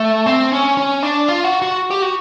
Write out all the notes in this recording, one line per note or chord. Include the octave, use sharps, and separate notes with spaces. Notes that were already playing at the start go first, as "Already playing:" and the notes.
Already playing: A3
C4
C#4
C#4
D4
F4
F#4
F#4
G4
F#4